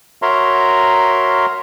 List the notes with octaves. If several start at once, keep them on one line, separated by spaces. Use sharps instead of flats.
F#4 A#4 C#5 E5 A#5 C6